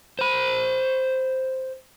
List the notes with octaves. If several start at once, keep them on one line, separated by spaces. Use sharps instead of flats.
C5 B5